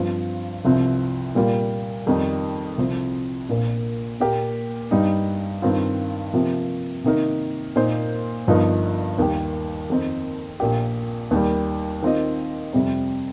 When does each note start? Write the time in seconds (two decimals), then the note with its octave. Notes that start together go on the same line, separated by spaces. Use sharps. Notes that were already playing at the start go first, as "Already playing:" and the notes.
Already playing: G2 F3 C4 F4 C5
0.65 C2 C3 F3 C4
1.35 A#2 G3 A#3 F4
2.07 F2 D#3 G3 D#4
2.78 C2 C3 F3 C4
3.49 A#1 A#2 A#3
4.20 A#2 A#3 G4 A#4
4.91 G2 G3 D#4
5.62 G2 D#3 C4 F4
6.33 C3 F3 A#3 G4
7.04 C3 D#3 A#3 D#4 A#4
7.76 A#2 A#3 D#4 C5
8.47 G1 G2 F3 D#4 A#4
9.18 D#2 D#3 G3 A#3 G4
9.90 F2 D#3 C4 D#4
10.60 A#1 A#2 A#3 G4
11.31 D#2 D#3 G3
12.02 D#3 C4 F4 D#5
12.73 F2 C3 G3 C4